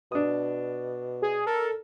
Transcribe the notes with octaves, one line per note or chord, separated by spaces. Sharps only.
B2 D4 D#6
G#4
A4 A#4